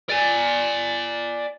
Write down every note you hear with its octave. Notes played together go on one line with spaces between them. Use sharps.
D5 G#5